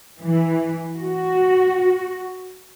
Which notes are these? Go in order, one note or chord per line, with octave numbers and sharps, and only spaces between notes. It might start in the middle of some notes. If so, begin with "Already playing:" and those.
E3
F#4